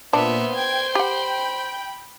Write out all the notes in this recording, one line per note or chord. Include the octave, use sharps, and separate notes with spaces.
A#2 B3 D4 C5 E5
G5 G#6
G4 F#5 B5